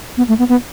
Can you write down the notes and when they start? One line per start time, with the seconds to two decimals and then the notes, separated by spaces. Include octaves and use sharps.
0.17 B3
0.28 A3
0.39 B3
0.49 B3